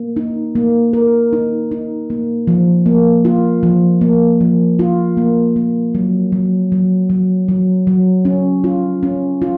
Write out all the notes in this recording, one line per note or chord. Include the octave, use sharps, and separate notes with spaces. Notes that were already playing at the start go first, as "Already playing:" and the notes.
Already playing: A#3
D#4
A#3
A#4
D#4
D#4
A#3
F3
A#3
F4
F3
A#3
F3
F4
A#3
A#3
F#3
F#3
F#3
F#3
F#3
F#3
C#4
F4
C#4
F4